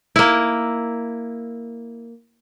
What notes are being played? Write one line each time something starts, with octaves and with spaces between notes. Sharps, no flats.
A#3 E4